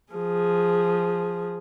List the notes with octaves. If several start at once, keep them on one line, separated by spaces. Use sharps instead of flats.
F3 G#4